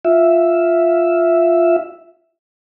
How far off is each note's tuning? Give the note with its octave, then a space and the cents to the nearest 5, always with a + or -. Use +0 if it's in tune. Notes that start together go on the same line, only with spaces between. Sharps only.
F4 +0 E5 +0